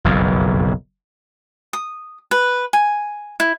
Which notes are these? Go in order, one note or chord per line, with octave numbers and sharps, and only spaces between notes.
F#1 B1 F2
D#6
B4
G#5
E4